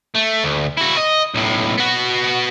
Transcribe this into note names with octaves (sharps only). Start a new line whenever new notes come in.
A3
D2
E4 F#4
D#5
B1 A2
B3 F#4